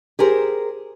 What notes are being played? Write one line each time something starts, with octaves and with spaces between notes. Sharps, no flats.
G4 G#4 A#4 C5